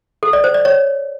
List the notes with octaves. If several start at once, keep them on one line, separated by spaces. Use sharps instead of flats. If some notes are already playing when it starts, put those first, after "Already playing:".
A4
D5
C5
D5
C#5